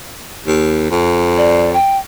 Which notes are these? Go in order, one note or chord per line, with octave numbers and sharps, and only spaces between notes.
D#2
F2
D5
G5